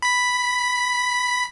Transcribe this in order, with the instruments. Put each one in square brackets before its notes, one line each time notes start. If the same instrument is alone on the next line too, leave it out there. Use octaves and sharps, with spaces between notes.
[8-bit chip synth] B5 B6